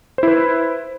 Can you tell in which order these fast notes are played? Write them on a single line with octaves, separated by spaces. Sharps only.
C5 E4 B4